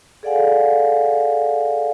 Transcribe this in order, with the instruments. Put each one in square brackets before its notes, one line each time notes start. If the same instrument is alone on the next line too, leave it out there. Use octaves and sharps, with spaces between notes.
[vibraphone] G#4 A4 D5 F5 F#5 G#5